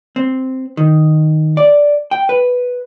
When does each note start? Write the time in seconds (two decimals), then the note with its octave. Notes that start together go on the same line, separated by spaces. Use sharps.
0.16 C4
0.77 D#3
1.57 D5
2.11 G5
2.29 B4